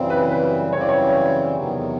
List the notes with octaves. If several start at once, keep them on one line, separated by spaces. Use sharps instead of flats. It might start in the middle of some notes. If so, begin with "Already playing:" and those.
Already playing: F#2 C#3 E3 G3 C4
B4
B4
F#2 C#3 E3 G3 C4 C#5
D5
C#5
E2 C3 D#3 F#3 B3